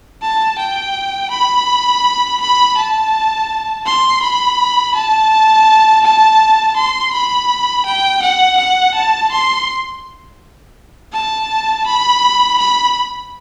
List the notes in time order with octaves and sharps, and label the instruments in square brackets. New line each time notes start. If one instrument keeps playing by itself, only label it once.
[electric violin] A5
G5
B5
B5
A5
C6
B5
A5
A5
C6
B5
G5
F#5
F#5
A5
C6
A5
B5
B5